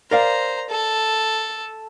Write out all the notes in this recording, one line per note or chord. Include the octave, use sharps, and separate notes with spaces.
A#4 C5 D5 F5 A#5
A4